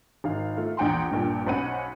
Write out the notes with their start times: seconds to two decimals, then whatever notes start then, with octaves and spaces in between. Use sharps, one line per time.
0.24 G#1 D#3 F5
0.57 A3 F4
0.77 A#1 E2 F#5 G5 A#5 C6
1.12 A#1 G2 A#2 G5
1.47 B1 C#4 C5 F#5 B5 D#7